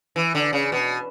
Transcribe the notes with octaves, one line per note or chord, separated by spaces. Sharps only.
E3
D3
C#3
B2